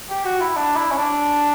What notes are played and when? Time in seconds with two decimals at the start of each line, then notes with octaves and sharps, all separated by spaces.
0.10 G4
0.25 F#4
0.41 E4
0.56 D4
0.76 E4
0.91 C#4
0.98 D4